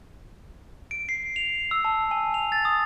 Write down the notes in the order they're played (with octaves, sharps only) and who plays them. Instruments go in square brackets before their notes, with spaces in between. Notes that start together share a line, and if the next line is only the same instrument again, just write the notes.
[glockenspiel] D7
C7
F7
E6
A5
G#5
F7
A6
D#6